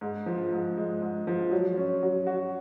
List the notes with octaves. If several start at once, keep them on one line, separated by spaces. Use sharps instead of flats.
G#2
F3
G#2
G#3
G#2
F3
F#3
C#4
F#3
F#4